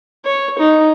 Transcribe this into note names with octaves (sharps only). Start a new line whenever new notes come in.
C#5
D#4